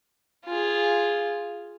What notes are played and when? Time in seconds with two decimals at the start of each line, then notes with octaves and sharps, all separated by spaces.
0.46 F4 G#4